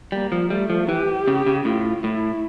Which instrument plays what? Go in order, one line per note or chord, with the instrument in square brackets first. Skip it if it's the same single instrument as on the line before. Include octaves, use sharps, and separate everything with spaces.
[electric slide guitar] G3 [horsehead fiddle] A#3
[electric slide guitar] F3
[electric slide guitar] G3 [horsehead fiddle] A3
[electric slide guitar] F3
[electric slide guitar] E3 [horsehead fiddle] G4
[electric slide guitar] C#3
C#3
[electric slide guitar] A2 [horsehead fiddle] F4
[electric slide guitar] A2 [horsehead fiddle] E4